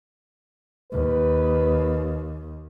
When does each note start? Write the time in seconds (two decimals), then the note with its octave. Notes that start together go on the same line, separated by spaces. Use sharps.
0.92 D#2 B4